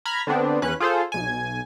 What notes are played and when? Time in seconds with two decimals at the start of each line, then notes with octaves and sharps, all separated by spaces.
0.05 A#5 B5 F6 G#6
0.27 D3 B3 C4 D4
0.62 E2 C#4 B4 F#6
0.80 F4 G#4 A4 C5
1.12 B1 G#5